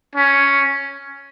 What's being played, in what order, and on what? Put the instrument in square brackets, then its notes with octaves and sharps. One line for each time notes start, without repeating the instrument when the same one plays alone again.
[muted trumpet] C#4